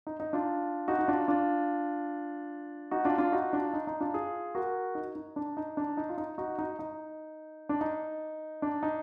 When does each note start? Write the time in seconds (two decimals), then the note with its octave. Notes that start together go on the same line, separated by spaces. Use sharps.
0.07 D#4
0.20 D#4
0.33 D4 F4
0.88 D#4 F#4
0.99 D#4
1.08 D4 F4
1.28 D4 F4
2.91 D#4 F#4
3.05 D4 F4
3.18 D4 F4
3.32 D#4 F#4
3.53 D4 F4
3.74 D#4
3.87 D#4
4.00 D4 F4
4.14 F4 G#4
4.55 F#4 A#4
4.95 D#4
5.15 D#4
5.36 D4
5.57 D#4
5.77 D4
5.97 D#4
6.09 F4
6.18 D#4
6.38 D#4 F#4
6.59 D#4
6.79 D#4
7.69 D4
7.81 D#4
8.62 D4
8.83 D#4